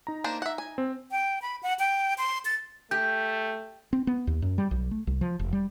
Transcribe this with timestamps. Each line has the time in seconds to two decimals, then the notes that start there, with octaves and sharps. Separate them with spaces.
0.07 D#4 A#5
0.24 A#3 D4 C5
0.42 E5 F#5
0.58 G#5
0.78 C4
1.11 G5
1.42 B5
1.63 F#5
1.79 G5
2.18 C6
2.45 A6
2.91 A3 G4 G6
3.93 C4
4.07 B3
4.27 D#2
4.42 F#2
4.58 G3
4.71 B1
4.91 A3
5.07 C2
5.21 F3
5.39 F1
5.53 G3